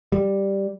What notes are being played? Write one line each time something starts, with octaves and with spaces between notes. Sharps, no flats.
G3